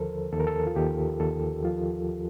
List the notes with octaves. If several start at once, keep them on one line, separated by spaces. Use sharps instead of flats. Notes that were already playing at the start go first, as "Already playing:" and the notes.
Already playing: D#2 D3 F3 A4 A#4 C5
D#2 A4
A#4
A4
F4
D#2 G4
D#2 A4
F3 F4